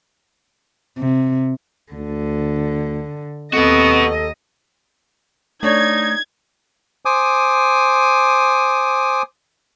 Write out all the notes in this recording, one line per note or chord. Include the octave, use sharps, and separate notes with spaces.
C3
D2 D3
D#2 B3 C4 F#4 A4 D#5
A3 D4 D#4 C#5 G#6
C5 G#5 D6 D#6